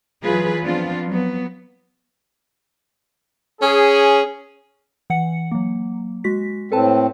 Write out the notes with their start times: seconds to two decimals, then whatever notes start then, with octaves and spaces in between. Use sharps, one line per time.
0.22 E3 F#3 F4 G#4 B4
0.63 F3 B3 C4 D4 F4
1.07 F#3 B3
3.62 C#4 G#4
5.10 E3 F#5 C#7
5.52 F#3 A#3
6.24 G#3 F#4 B6
6.72 A2 C4 A4 B4 A5